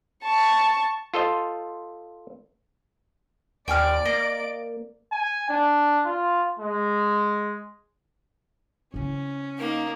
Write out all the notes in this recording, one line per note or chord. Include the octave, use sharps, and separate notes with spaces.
A5 C#6
F4 A4 C5 D#5
D#2 D5 G5 G#5 F6 D7
A#3 D#5
G#5
D4
F4
G#3
C#3 C#4 E4
A#3 D#4